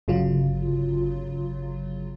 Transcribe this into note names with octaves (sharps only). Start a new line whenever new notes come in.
G1 C#3 F#3 F4